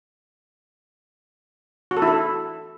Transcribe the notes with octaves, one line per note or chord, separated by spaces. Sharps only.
F#4
A4
E4
A4